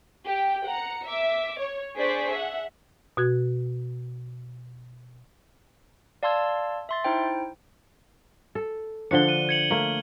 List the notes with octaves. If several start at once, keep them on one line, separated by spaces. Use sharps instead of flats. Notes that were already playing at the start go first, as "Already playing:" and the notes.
G4 G5
F#5 A#5 C#7
E5 D6
C#5
D4 G#4 C5 D5 C#6 B6
E5 F#5
B2 F#4 G#6
D5 F5 A5 C6 E6 G#6
E5 C6 A6
D#4 E4 C5 G5
A4
D3 F3 D4 C#7 G7
D#7
G#6 C#7 F#7
A3 A#3